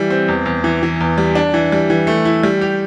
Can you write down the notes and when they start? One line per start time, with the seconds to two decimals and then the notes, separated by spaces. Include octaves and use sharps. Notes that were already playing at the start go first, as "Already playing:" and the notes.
Already playing: E3 G3
0.10 C4
0.28 E2
0.46 E2
0.64 E3
0.83 E3
1.01 E2
1.18 G3
1.35 D4
1.54 E3
1.72 G3
1.90 E3
2.07 A3
2.25 E4
2.43 G3
2.61 G4